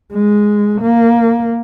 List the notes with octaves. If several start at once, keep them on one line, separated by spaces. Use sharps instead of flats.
G#3
A#3